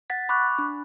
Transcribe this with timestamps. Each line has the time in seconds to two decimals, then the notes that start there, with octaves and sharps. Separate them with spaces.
0.10 F#5 A6 B6
0.29 B5 C#6 D6 F#6
0.59 D4